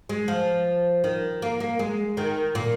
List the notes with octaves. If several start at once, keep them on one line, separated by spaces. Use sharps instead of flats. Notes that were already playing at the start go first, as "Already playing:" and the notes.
G#3
F3
D#3
A#3
A#3
G#3
D#3
A#2